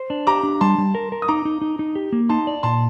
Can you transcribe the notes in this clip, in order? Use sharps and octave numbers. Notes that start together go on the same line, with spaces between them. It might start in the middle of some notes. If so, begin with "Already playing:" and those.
Already playing: C5
D4
G4 A#5 D6
D4
G3 A5 C6
G3
A#4
A#4
D#6
D#4 A#5 D6
D#4
D#4
D#4
G4
A#3
D#4 A5 C6
D5
A#2 A5 C6